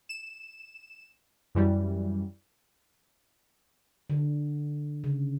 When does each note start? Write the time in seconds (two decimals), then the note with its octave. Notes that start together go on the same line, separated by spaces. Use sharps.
0.09 E7
1.55 F#2 E3 G3
4.10 D3
5.04 C#3